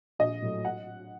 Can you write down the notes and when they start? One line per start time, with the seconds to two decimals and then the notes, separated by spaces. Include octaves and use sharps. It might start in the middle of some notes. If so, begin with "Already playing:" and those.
0.19 A#1 D#5
0.42 A2 F#3
0.65 F#5